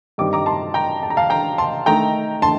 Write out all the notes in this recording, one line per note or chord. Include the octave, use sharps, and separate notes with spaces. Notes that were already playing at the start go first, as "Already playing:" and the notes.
G2 D#3 G3 C4 D#4 D6
A#5 D6
A5 C6
G5 A#5
A5
A#5
F5 A5
G5 A#5
A5 C6
D#3 A3 D#4 G5 A#5
A5 C6